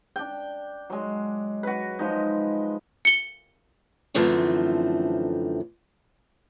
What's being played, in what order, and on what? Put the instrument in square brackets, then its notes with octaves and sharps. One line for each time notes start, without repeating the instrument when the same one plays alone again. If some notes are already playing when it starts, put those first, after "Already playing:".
[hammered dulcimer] D4 G5
F#3 G#3
F#4 B4
F3 G#3 D#4
[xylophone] C#7 G7
[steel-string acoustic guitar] F#2 D3 E3 F3 A3 C4